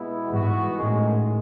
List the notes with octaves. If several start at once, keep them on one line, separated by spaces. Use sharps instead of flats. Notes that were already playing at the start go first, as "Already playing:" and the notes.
Already playing: B2 G#3 B3 E4
G#2 E3 B3 F#4
F#2 A2 D#3 G#3